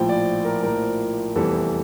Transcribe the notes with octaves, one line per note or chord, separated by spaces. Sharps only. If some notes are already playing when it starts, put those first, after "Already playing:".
Already playing: A#1 A2 F3 G5
D5
A#4
A#1 A2 F3 A#4
F1 E2 E3 G3 A4